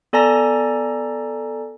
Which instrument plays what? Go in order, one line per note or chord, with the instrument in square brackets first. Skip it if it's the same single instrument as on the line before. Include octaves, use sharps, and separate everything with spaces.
[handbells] B3 A4 D5 G#5 A#5 A#6